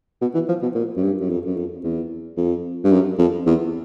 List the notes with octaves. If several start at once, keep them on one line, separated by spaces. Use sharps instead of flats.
B2
E3
F3
B2
A#2
F#2
G2
F#2
F2
F#2
F2
E2
F2
G2
F#2
F2
E2